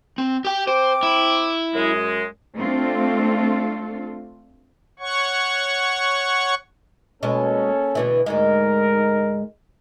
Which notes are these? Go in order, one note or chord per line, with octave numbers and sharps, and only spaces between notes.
C4
G4 G5
C4 C5 D6
E4
F#2 G#3
A3 C4 D4 F4 A4
C#5 F#5 C#6
B2 G#3 A#3 C#4 A4
D2 B2 E3
D2 G#2 G#3 D#4 A#4